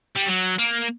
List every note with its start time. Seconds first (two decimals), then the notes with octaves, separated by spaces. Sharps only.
0.16 G3
0.27 F#3
0.59 A#3